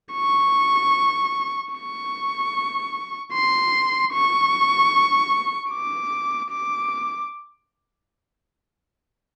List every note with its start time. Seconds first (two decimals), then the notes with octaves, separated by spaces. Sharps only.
0.14 C#6
1.74 C#6
3.33 C6
4.13 C#6
5.71 D6
6.50 D6